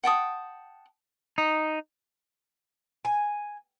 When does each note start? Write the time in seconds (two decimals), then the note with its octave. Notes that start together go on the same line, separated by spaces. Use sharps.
0.04 F#5 G5 A5 D#6
1.38 D#4
3.05 G#5